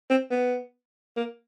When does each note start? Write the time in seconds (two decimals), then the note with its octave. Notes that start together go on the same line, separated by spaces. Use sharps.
0.10 C4
0.31 B3
1.17 A#3